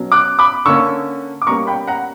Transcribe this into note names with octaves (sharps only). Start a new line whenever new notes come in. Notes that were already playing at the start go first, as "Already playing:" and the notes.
Already playing: B2 F#3 C#4
D6 F#6
B5 D6
D3 A#3 C#4 C#6 E6
D6
B2 G3 A#3 C#4 A#5 C#6
G5 B5
F#5 A#5